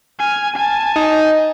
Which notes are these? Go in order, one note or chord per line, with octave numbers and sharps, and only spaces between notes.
G#5 F6
G#5 A5
D#4